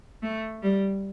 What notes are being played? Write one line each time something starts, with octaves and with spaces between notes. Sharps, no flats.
A3
G3